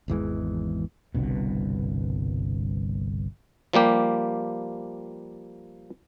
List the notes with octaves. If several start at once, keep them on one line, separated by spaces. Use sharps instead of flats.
G#1 E2 E3 G#3
G1 C2 G2 B2
F3 G3 A#3 G4